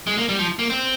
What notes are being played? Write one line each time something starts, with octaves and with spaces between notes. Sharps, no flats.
G#3
A#3
G3
F3
A#3
C4